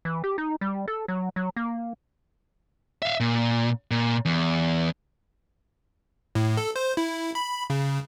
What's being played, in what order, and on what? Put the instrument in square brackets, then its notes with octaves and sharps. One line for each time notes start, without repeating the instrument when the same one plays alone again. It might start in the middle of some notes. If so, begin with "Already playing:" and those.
[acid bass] E3
G4
D#4
G3
A4
F#3
F#3
A#3
[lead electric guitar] E5 F5
A#2
A#2
E2
[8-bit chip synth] A2
A4
C5
E4
B5
C#3